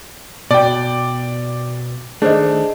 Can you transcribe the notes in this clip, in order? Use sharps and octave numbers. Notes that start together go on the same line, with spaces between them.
B2 D5 G5
D#3 A3 D4 G#4 C5 D#5